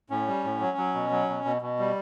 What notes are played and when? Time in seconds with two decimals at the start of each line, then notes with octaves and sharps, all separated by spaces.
0.10 A2 C#4
0.27 G3
0.44 A2
0.61 F#3
0.77 F#3
0.94 B2
1.11 F#3
1.29 B2
1.45 B2
1.62 B2
1.79 G3